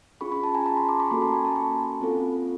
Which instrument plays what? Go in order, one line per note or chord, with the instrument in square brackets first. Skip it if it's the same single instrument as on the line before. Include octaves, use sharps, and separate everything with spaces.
[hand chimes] C#4 F4 G#4 B5 C#6
B5 C#6
A5 B5
G#5 A#5
A5 B5
A#5 C6
C6 D6
B5 C#6
A#3 C#4 F#4 A4 A#5 C6
A5 B5
G#5 A#5
A5 B5
B5 C#6
C4 F4 A4